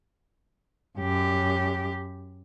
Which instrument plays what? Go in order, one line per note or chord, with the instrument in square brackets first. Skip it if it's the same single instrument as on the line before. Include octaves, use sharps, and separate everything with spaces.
[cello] F#2 G4